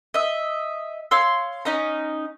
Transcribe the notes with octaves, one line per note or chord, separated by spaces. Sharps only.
D#5 E5
C#5 F5 C6 E6
C#4 D#4 D#5 A#5